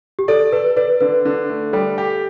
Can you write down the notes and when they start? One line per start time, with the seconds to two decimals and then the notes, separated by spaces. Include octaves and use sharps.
0.19 G4
0.28 A4 D5
0.52 A4 B4
0.76 B4 D5
1.01 D3 B4
1.25 D3
1.49 A3
1.73 G3 A4
1.98 G4